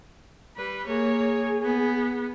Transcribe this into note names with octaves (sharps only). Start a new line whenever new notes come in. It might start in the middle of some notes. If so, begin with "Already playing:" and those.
G3 B4
A#3 G#4 C#5
B3